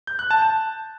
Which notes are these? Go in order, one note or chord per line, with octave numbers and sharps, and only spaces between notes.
G6
F#6
A5
A5